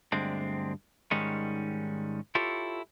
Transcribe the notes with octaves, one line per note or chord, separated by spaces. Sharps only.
D2 G2 D3 G#3 C4 D4
G#2 D#3 G3 G#3 C#4
E4 F4 G4 A4 C#5